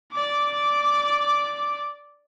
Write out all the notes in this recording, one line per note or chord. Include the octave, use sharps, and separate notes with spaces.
D5 D6